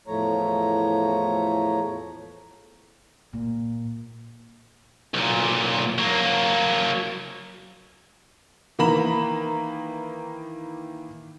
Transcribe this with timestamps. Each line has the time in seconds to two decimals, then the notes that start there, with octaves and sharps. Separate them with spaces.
0.07 E2 A2 F3 A3 C#5 A#5
3.33 A#2
5.14 B1 A#2
5.98 F#3 A#3
8.79 D#3 E3 A#3 A#5 B5 E7